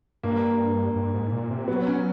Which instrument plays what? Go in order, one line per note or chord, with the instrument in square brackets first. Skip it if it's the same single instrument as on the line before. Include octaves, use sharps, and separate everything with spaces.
[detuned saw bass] G2 [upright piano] A#3
[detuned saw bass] G2
G#2
A#2
C3
[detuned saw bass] F#3 [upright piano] B3
[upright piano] C#4